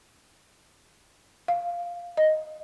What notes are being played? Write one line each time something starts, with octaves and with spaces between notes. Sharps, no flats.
F5
D#5